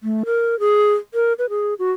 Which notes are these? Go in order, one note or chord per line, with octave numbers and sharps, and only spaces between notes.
A3
A#4
G#4
A#4
B4
G#4
F#4